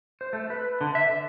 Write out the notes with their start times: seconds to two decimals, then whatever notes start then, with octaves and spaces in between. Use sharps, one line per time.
0.21 C5
0.33 A3
0.50 B4
0.81 D3
0.95 E5
1.10 D3